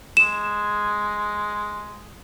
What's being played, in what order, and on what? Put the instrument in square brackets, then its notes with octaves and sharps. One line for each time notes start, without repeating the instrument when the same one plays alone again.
[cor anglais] G#3 [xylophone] E7